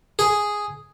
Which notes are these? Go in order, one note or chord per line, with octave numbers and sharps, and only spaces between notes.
G#4